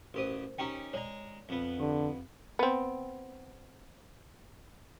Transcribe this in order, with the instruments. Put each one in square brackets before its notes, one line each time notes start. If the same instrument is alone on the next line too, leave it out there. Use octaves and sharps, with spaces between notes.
[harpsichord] A1 G4 D#6 [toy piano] F#4 A#4 C5
[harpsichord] C#4 D#4 G4 [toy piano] G5 A#5
[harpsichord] G#3 A#5 [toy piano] C#5 D5
[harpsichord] F2 B3
[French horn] D3 [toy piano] G4
[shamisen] B3 C4